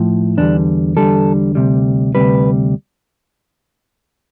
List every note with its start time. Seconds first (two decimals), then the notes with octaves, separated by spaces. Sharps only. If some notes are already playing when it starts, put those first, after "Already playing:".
Already playing: A2 F3
0.37 E2 D3 G3 D4
0.97 E2 D3 G3 A4
1.55 D2 C3 G3
2.15 D2 C3 G3 B4